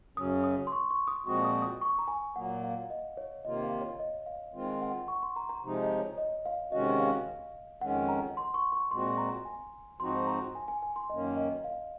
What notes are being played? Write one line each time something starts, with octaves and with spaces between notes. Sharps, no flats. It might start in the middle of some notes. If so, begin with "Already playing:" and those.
F#2 C#3 F#3 C#4 D#6
D#6
C6
C#6
C#6
D#6
A#2 F3 G#3 C4 F#4 C#6
D#6
D#6
C#6
A#5
G#5
A#2 F#3 A#3 F#5
F5
D#5
C#5
C3 D#3 A#3 F4 D#5
F5
C#5
D#5
F5
D#3 G#3 C4 F4
F#5
C#6
C6
A#5
A#5
C3 F3 G#3 D#4
D#5
C#5
D#5
F5
C3 D#3 G#3 C#4 F#4 D#5
F5
F2 D#3 G#3 C#4 F#5
A#5
C6
C#6
C#6
A#2 G#3 C4 F#4 C6
A#5
G#5
G#2 F3 C4 D#4 F#4 C6
A#5
G#5
G#5
G#5
C6
F#2 D#3 A#3 C#4 D#5
D#5
F5